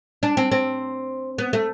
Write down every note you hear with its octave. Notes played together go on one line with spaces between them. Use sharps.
D4
C4
C4
B3
A3